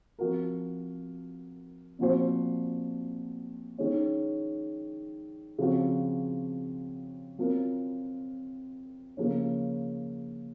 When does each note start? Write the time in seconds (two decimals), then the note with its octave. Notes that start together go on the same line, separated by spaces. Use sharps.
0.19 F3 C4 F#4 A#4
1.99 A#2 F3 C4 F#4 C5
3.78 D#3 G#3 C#4
5.58 C#3 F3 C4 F#4
7.38 F#3 C4 F4 A#4
9.17 C#3 F3 A#3 C#4